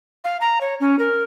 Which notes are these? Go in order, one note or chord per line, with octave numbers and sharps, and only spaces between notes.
F5
A#5
C#5
C#4
A#4